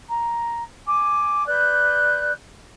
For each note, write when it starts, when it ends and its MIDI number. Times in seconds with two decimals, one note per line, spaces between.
0.08 0.61 82
0.86 1.45 80
0.86 1.45 86
1.47 2.31 71
1.47 2.31 74
1.47 2.31 90
1.47 2.31 91